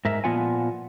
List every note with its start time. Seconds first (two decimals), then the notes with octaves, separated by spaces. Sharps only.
0.05 G#2 A#4 E5
0.24 A#2 F3 B3 F4 F#5 G#5